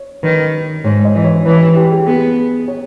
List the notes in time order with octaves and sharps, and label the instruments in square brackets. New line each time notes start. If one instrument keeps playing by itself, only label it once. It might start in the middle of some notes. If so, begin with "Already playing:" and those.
Already playing: [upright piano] C#5
[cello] D#3 [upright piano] B4
[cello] G#2 [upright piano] C#5
[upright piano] D#5
[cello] E3
[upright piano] C#5
[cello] E3 [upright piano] B4
[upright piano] G4
G4
G#4
[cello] B3 [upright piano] G#4
[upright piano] C#5